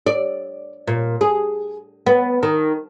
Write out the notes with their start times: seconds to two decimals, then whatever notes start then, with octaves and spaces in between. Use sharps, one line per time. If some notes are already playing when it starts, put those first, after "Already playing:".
0.07 D5
0.88 A#2
1.21 G#4
2.07 B3
2.43 D#3